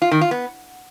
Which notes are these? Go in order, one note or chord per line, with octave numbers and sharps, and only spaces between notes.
F4
D#3
F4
B3